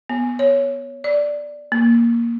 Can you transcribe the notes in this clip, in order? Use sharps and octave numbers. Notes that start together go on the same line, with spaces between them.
B3
C#5
D5
A#3